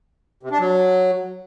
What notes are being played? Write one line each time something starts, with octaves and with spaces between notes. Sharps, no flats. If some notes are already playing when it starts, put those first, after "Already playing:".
C3
D4
F#3